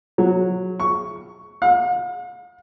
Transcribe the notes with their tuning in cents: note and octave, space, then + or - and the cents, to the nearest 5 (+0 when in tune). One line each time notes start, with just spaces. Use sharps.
F#3 -10
C#6 +10
F5 +45